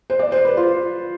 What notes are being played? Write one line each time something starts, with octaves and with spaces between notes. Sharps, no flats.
C5
D5
C5
B4
F4